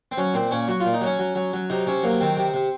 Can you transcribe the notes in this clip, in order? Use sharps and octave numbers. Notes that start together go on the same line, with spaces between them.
C4
F#3 C#4
A#2 C4
A#2 C#4
F#3 F#4
A#2 F4
D#4
F#3 C#4
F#3
F#3
F#3
C3 D#4
C3 C#4
F#3 A#3
D#3 C4
C3
C3